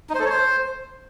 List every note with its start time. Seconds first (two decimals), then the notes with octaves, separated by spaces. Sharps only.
0.09 D#4
0.15 C5
0.20 A4
0.25 C#5
0.30 C5